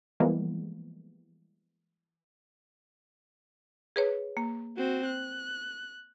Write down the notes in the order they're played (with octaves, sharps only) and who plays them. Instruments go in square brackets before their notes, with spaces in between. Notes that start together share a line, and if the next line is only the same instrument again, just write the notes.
[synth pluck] E3 F3 G3 G#3 A#3 B3
[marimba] G#4 B4 C#5
A#3
[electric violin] C4 F#4
F#6